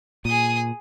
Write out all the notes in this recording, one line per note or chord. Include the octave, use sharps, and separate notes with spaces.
A#2 G#4 D#6